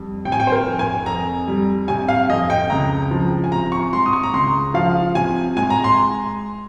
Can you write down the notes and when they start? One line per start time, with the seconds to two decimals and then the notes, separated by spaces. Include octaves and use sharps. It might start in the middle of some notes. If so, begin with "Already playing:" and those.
Already playing: F2 G3
0.25 C3 G5
0.32 G#5
0.40 G5
0.47 C5
0.52 A#4
0.65 F2
0.79 G#5
1.06 F2 A#5
1.48 G3
1.88 C3 G#5
2.08 F5
2.29 F2 D#5
2.50 G5
2.70 C#2 A#5
3.11 F3
3.44 G#5
3.52 C3 A#5
3.72 C#6
3.92 G#3 C6
4.06 D#6
4.13 C#6
4.23 A#5
4.33 C#2 C6
4.74 F3 F5
5.15 C3 G#5
5.56 G#3 G#5
5.70 A#5
5.84 C6